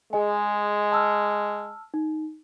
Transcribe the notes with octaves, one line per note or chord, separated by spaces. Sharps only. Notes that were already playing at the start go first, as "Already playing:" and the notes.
G#3 G#4 D#5 G#5
A5 E6 F6
D#4